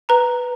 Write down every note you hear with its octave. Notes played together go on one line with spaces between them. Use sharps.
B4 A#5